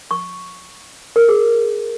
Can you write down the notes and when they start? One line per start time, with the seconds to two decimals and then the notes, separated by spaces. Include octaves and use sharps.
0.11 C#6
1.16 A#4
1.28 G#4